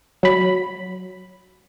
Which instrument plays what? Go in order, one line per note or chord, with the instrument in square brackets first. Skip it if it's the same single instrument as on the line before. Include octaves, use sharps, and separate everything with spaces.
[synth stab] F#3 B5